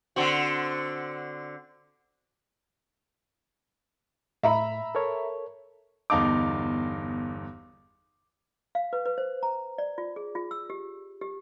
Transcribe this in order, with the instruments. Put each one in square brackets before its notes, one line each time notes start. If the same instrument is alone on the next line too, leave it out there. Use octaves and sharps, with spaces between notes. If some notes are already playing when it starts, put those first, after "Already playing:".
[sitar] D3 C4 F#4
[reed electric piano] A2 [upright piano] E5 A#5 B5
[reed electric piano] A4 A#4 C#5
[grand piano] G1 E2 D#4 F5 A5 D6
[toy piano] F5
B4
B4
C5
A#5
D5
F4
G#4
F4
E6
G4
G4